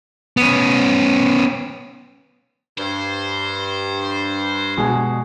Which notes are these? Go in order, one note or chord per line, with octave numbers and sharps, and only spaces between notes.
B3 C#4
G2 C5
B2 G#3 G#4